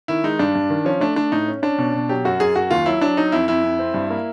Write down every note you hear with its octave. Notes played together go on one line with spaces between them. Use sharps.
D#3 E4
G#3 D#4
G2 D4
G2
D#3
F3 C#4
A3 D4
A3 D4
A2 D#4
C#4
C#4 D4
B2
B2
F#3 G4
F#2 F#4
F#2 G#4
F#2 F#4
D#2 F4
F#3 E4
F#3 D4
F#3 D#4
F2 E4
F2 E4
F2
C4
G2
A#3